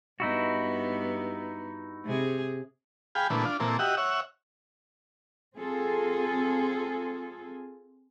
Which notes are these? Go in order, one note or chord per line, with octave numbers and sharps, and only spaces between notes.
G2 B3 D#4 E4 F#4
C3 G#4
G#4 F5 G5 B5
A#2 D3 E3 A3 B3
D4 F4
A#2 E3 A#3 C4 A4
F#4 G4 D#5 E5 F#5
C#5 E5 F#5
C4 F4 G#4 A4